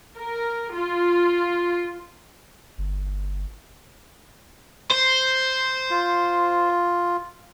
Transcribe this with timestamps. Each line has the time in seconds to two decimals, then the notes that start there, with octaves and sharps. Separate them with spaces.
0.18 A#4
0.75 F4
2.78 G1
4.91 C5
5.91 F4